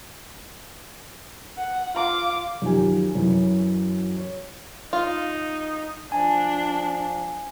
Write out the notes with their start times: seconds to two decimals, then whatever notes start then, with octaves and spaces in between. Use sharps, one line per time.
1.57 F#5
1.95 F4 D6
2.62 F#2 D#3 F3 G4 G#5
3.15 F#2 E3 F#3
4.17 C#5
4.93 D#4 F4
6.12 F3 D4 G#5